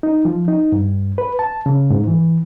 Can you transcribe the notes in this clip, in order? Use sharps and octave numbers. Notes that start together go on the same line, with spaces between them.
D#4
F3
D#4
G2
B4
A5
C#3
G#2
E3